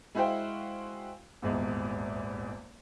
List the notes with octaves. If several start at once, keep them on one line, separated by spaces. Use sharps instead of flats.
G#3 E4 F#4 C5 F5 G5
D#1 G#1 E2 G#3